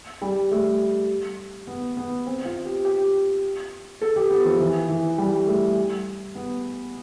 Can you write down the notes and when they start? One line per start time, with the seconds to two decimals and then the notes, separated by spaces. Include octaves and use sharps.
0.22 G3
0.51 A3
1.67 B3
1.97 B3
2.27 C4
2.45 F4
2.65 G4
2.85 G4
4.01 A4
4.16 G4
4.30 B3
4.45 F3
4.60 E3
4.89 E3
5.18 G3
5.47 A3
6.35 B3